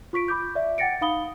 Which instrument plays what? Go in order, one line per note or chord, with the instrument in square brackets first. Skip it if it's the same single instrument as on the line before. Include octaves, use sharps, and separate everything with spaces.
[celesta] F4 C#6 B6 D7
B5 D6 G6
D5 E5
F#5 G5 A6 A#6 C#7 D7
D#4 F5 B5 D#6 G7